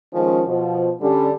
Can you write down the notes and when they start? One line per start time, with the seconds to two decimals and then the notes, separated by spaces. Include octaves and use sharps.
0.13 D#3 F3 G#3 C#4
0.47 B2 F3
1.01 D3 G3 C#4